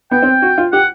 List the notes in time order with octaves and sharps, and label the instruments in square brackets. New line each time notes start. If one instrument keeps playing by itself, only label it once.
[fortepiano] B3 [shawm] G5
[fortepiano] C4
F#4
F4
[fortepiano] G4 [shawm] F#5